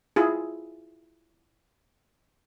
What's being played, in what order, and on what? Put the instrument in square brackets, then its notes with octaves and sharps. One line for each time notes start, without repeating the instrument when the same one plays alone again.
[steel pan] E4 F4 G#4